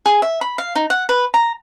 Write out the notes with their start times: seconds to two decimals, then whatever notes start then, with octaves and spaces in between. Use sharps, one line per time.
0.06 G#4
0.22 E5
0.41 B5
0.58 F5
0.75 D#4
0.90 F#5
1.09 B4
1.34 A#5